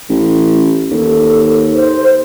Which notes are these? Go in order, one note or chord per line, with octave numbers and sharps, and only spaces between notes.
A1
D#2 A4
C5